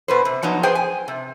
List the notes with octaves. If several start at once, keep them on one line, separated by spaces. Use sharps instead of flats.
B2 B4 C5
C3
F3 F#3 B3 D#4
G#4 B4 C5 G5
G#5
C3